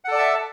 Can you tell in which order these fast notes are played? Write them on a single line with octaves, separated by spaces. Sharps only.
F#5 A4 D5 A5 E5